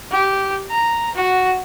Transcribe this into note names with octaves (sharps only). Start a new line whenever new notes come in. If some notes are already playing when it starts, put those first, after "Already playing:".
G4
A#5
F#4